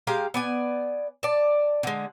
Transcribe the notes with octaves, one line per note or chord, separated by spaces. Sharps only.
G#3 G4 F5 A#5
B3 D5 G#5
D5 A5
D3 G#3